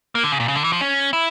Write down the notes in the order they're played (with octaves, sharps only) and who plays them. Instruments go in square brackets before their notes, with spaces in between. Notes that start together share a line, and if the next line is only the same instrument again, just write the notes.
[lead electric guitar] A#3
D3
C#3
A#2
C#3
D3
E3
F3
C#4
E4